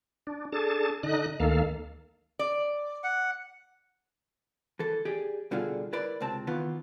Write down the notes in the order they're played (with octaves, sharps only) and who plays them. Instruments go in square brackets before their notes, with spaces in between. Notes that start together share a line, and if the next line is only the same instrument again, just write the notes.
[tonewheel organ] D4
D4 G#4 A4 A5
D3 D#4 D#5 F#6
D2 D#3 A#3 A4 F5
[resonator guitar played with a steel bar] D5
[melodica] F#5
[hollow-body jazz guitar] E3 A4
G4 G#4 D5
B2 D3 G3 F4 G#4
E4 A#4 B4 D5 B5
C#2 C3 C4 A5
D#3 E3 B3 F4